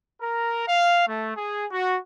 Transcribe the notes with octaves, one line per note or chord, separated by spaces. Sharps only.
A#4
F5
A3
G#4
F#4